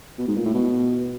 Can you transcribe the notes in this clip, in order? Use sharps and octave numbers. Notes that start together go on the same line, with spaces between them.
B2
G#2
A#2
A2
B2